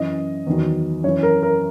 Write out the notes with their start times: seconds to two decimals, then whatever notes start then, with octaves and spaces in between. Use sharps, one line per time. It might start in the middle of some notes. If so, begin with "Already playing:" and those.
Already playing: F#2 E3 D#5
0.47 E2 D#3 F#3
1.03 F#2 E3 C#5
1.23 A#4
1.43 A#4